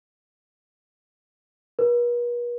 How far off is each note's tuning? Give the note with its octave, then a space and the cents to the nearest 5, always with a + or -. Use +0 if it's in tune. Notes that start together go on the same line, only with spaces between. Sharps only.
B4 -45